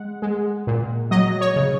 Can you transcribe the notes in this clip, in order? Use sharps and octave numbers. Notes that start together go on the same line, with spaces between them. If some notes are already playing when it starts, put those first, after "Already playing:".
Already playing: G#3 F#5
G#3
A#2
F#3 D#5
C#5
C#3